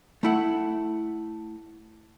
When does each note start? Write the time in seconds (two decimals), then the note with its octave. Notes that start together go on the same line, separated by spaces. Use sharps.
0.23 A3 E4 F#5